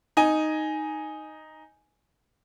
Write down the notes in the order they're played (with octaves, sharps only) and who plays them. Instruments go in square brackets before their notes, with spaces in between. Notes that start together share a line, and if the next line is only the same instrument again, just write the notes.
[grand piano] D#4 G#5